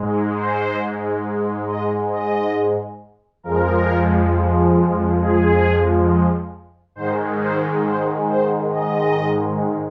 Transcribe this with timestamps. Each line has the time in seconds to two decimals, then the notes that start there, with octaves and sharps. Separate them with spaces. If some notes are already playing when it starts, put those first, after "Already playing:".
Already playing: G#2 G#3
0.36 C5
1.68 D#5
2.12 D#5
3.43 F2 F3 G#3 A#4
5.20 G#4
6.95 G#2 D#3 G#3 C5
7.40 C5
7.84 C5
8.28 C5
8.71 D#5